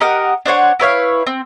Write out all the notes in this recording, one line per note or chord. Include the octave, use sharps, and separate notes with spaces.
G4 A#4 D#5 F#5
D4 C5 C#5 F#5
E4 B4 C#5 F5
C4